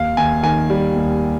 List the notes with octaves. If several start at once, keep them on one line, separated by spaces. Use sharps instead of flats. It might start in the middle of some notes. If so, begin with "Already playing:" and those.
Already playing: D#2 F5
D#2 G#5
D#3 G#5
G3
D#2